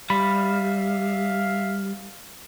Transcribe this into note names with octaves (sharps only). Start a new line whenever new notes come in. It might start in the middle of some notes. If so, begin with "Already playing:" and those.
G3 E5 F5 B5